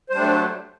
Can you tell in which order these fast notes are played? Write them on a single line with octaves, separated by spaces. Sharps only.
C5 G3 D4 A3 F#3